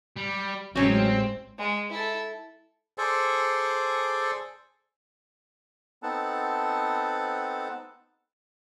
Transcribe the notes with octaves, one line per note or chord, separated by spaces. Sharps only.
G3
A1 F#3 G#3 C4 C#4
G#3
E4 A4
G#4 A4 C5 D5
B3 C4 D#4 A4 F#5 A5